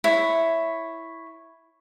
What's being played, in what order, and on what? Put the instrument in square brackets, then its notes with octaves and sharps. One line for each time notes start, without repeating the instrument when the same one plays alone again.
[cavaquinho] E4 C#5